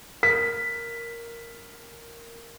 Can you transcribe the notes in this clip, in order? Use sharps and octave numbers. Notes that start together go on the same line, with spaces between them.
A#4 B6